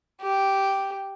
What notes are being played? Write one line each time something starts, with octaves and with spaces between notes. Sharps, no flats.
G4